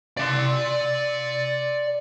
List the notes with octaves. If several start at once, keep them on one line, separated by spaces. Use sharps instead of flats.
D5 C6